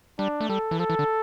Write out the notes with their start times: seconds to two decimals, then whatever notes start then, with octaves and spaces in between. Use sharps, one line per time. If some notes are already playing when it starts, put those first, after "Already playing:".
0.19 G3 D4
0.41 A3
0.49 G3 A4
0.71 E3
0.79 F3 A4
0.90 E3
0.99 D3